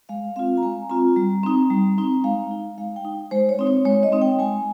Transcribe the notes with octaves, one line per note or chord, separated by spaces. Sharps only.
G#3 F5
C4 F4 F5
A#5
G#3 G#5
C4 F4 A#5
G3
C4 D#4
G3
C4 D#4
G#3 F5
D#4
G#3 F5
G5
D#4
G#3 C5
C#5
C4 D#4
C#5
G#3 C#5
D#5
C4 D#4
G5
G#3 G#5